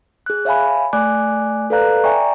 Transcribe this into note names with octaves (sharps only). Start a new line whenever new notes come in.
G#4 F#6
C#5 E5 F5 G#5 B5
A3 D5 G#5 D6 F#6
A4 B4 D5 F5 A#5 F#6
D5 E5 G5 G#5 A#5 C#6